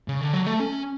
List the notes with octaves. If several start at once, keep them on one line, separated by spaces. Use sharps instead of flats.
C#3
D3
F#3
A3
C#4